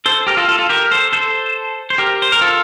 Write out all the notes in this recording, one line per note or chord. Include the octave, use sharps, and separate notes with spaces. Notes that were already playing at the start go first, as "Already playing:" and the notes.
A4 C5
G4 A#4
F4 A4
F4 A4
F4 A4
G4 A#4
A4 C5
A4 C5
C5
G4 A#4
C5
A#4
F4 A4